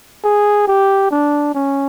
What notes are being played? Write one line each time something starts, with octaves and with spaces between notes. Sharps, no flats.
G#4
G4
D4
C#4